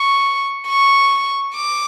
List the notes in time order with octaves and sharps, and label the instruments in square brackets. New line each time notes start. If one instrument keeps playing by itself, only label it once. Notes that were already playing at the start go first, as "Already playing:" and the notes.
Already playing: [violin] C#6
C#6
D6